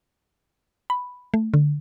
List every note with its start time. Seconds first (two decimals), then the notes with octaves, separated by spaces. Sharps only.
0.90 B5
1.34 A3
1.54 D3